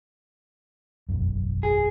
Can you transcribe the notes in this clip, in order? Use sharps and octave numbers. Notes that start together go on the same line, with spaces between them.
E1 A1 F#2
G#4